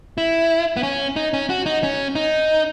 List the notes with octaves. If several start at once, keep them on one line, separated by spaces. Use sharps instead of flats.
E4
B3
C#4
D#4
C#4
F#4
D#4
C#4
D#4